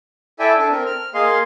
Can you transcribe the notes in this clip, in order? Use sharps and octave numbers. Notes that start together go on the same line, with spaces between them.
E4 A4 D5 E5 G5 G#5
D4 A4
C4 A#4
F6
A#3 G#4 D#5 F5 C6